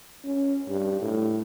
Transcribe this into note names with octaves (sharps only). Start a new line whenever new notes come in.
C#4
G2
A2